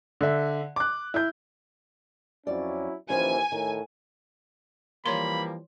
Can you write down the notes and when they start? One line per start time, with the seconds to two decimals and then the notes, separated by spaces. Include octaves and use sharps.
0.21 D3 E5
0.76 D6 F#6
1.14 E4 G6
2.47 F2 F#3 C#4 E4 D5
3.09 D#2 A#2 E3 F3 C#4 E4 G#5
3.52 A2 D#3
5.06 E3 F3 G3 A#3 C#5 B5 C6